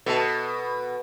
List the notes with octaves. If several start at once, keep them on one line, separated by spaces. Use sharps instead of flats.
B2 A4 D#5 A5